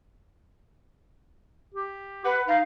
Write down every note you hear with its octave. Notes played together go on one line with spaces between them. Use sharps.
G4
B4 F#5
D#4 F5